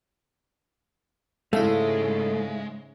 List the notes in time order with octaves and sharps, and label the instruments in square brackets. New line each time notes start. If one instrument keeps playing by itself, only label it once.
[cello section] G#2 C#3 [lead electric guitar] G#3 [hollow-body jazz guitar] A3 [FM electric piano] E4 E5 F5